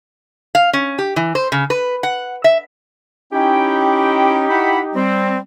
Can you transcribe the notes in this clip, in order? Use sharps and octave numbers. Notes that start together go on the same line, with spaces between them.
F5
C#4
G4
E3
C5
C#3
B4
F#5
E5
C#4 D#4 E4 G4 G5
E4 F#5 B5
G3 C4